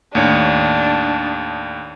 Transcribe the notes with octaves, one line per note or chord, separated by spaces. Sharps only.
D#2 A2 D4 C#5